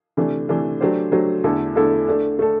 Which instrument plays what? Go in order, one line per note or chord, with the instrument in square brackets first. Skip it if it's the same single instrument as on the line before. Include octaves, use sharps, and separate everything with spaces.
[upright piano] C3 E3 A3 D4
C3 E3 A3 D4
F#3 A3 D4 G4 C5
F#3 A3 D4 G4 C5
E2 D3 A3 E4 A4
E2 D3 A3 E4 A4
A3 D4 A4
A3 D4 A4